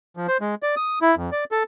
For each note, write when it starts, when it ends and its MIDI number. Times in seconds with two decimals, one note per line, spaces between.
0.17 0.27 53
0.28 0.37 72
0.41 0.55 56
0.63 0.75 74
0.76 0.99 87
1.02 1.15 64
1.16 1.30 41
1.32 1.44 74
1.52 1.63 69